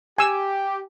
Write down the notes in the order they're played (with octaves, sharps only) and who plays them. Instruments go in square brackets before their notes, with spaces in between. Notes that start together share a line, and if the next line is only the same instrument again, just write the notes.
[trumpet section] G4 [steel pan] G#5 E6